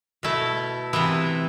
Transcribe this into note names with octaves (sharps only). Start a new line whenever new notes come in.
B2 A3 E4
C3 E3 B3 E4